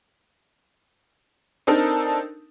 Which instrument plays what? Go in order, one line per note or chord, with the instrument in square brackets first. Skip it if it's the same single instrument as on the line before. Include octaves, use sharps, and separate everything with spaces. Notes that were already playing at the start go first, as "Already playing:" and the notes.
[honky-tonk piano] C4 D4 D#4 A4 A#4